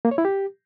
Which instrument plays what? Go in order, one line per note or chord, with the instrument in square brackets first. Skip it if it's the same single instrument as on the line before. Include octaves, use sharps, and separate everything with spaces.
[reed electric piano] A#3
C#5
E4
G4